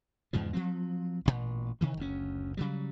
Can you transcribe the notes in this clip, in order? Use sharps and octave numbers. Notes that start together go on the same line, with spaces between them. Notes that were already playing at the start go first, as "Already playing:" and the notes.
E2 G#2 C#3 F3
F3 F#3 C4
A1 F#2 A#2
C3 D#3 E3
F#1 D2 C#4
C#3 F#3 G3